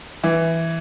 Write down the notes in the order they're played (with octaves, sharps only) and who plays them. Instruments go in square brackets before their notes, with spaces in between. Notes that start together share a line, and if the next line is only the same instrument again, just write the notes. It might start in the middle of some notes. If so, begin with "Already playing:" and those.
[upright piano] E3